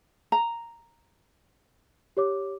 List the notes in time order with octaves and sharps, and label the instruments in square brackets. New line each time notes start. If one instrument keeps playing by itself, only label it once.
[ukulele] A#5
[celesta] G4 C#5 D6